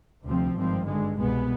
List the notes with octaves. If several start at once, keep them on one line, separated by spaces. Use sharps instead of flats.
D2 C3 F3 C4
G#1 G2 F3 C4
G2 D3 G#3
C2 B2 G#3 B3